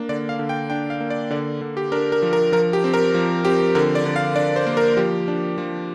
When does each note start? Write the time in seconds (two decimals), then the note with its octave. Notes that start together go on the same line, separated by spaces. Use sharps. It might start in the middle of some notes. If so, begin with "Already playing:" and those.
Already playing: A#3 D4
0.09 D3 D5
0.29 F5
0.39 D3
0.49 G5
0.70 D4 G5
0.90 F5
1.01 A#3
1.10 D5
1.31 D3 D5
1.61 D3
1.77 G4
1.92 D4 A#4
2.12 A#4
2.22 F3
2.33 A#4
2.52 F3 A#4
2.73 G4
2.84 C4
2.94 A#4
3.14 F3
3.45 C4 G4
3.75 D3 A#4
3.95 D5
4.05 D3
4.16 F5
4.36 D4 D5
4.56 C5
4.66 A#3
4.77 A#4
4.97 F3 G4
5.28 D4
5.58 F3